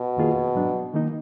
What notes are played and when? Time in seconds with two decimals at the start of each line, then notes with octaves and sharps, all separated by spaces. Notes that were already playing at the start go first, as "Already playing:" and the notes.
Already playing: B2
0.17 F2 D#3 A#3 F4 G#4
0.55 G#2 F#3 D4
0.94 D#3 A#3 D#4